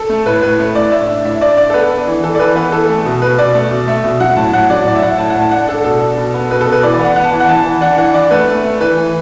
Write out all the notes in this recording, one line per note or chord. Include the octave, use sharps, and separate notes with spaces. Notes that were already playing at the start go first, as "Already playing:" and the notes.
Already playing: A4
A3
A2 B4
A2 B4
A3
A2 D5
D4 E5
D4
A2 E5
D4 D5
D4 D5
A4
B3 B4
D4
E3
E3 A4
D5
E3 B4
B3 B4
E3 A4
A3
B2
B2 B4
B2 D5
A3
B2
A3 E5
B2
F#3 F#5
A2 A5
A2 F#5
F#3 D5
A2 D5
E5
A2 F#5
A2 A5
F#5
A2
A5
D4 F#5
D4 A4
B2 A4
D4
B2
B3
B2 B4
A4
B2
B4
E3 D5
D5
B3
F#5
B3 F#5
A5
E3
F#5
E3 A5
E3
D4 F#5
E3 F#5
D4 D5
A3 B4
A3
A3
E3 B4
E3